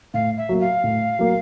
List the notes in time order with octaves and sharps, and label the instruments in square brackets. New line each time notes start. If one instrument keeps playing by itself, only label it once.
[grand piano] A2 [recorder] F5
[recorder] E5
[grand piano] F#3 A#3
[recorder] F5
[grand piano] A2
F#3 A#3